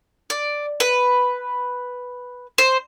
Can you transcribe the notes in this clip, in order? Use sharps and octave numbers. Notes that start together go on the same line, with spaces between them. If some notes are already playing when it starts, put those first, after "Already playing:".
D5
B4
C5